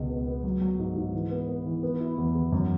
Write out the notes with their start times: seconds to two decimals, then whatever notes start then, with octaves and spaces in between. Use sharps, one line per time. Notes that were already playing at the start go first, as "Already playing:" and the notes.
Already playing: C#2 B2
0.10 B3
0.27 B3
0.44 F#3
0.61 F#3
0.79 G#2
0.96 G#2
1.14 E3
1.31 B3
1.48 B3
1.66 E3
1.83 B3
2.00 E4
2.18 E2
2.35 E2
2.52 F#2